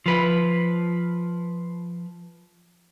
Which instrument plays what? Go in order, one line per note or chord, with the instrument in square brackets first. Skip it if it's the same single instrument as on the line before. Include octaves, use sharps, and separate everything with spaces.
[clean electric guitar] F3 B4